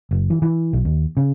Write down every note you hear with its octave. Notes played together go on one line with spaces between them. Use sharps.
F#1
E3
E3
B1
D#2
C#3